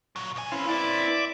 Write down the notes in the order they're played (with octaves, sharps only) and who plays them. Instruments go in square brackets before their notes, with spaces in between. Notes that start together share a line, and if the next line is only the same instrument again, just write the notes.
[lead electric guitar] A#2 F#3
B1 G#5
[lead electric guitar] C4 B4 [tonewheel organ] C#4 E4 F5
[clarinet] E4 [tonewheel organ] D5 E5 D6